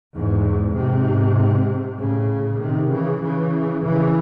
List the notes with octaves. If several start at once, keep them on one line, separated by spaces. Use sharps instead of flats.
E2 G#2
G#2 C3
A2 C#3
C3 D#3
C#3 E3
C#3 E3
C#3 E3